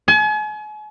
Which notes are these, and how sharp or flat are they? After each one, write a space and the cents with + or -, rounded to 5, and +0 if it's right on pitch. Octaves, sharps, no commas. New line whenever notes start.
G#5 +40